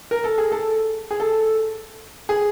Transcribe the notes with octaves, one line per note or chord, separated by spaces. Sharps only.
A#4
A4
G#4
A4
G#4
A4
G#4